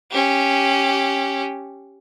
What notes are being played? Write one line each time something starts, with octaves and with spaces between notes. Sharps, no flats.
C#4 G4